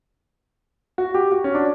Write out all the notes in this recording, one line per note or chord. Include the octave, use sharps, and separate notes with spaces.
F#4
G4
F#4
C#4
D4